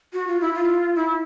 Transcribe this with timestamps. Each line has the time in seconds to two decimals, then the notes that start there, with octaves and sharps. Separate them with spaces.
0.13 F#4
0.27 F4
0.41 E4
0.54 F4
0.95 E4